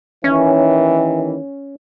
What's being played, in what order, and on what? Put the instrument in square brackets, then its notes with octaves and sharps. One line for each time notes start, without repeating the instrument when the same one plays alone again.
[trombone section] D#2 D#3 E3 [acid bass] C#4